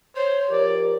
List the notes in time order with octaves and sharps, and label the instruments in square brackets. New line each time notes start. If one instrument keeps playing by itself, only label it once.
[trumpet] C5 [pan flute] C#5
[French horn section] F3 G4 A#4 [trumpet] D5